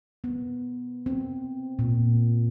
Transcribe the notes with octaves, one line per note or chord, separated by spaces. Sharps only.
B3
C4
A#2